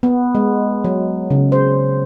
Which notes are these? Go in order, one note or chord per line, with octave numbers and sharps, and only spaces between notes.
B3
G#3
F#3
C#3
C5